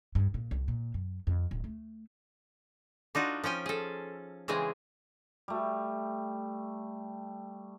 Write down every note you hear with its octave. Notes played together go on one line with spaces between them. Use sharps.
G2
A#2
C2
A#2
F#2
F2
D1
A3
D4 D#4 F4 F#4
F3 C#4 G5 G#5
G#4 A4
C#3 E3 G#3 C4 G#4
G3 A3